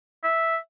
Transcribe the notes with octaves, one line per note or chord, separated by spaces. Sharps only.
E5